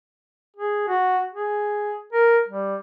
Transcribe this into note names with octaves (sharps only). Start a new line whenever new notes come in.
G#4
F#4
G#4
A#4
G3